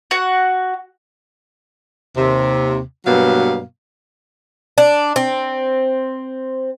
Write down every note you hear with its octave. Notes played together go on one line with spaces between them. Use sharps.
F#4 F#5
D#2 C3
G2 B2 F#3 A#3 F5
D4
C4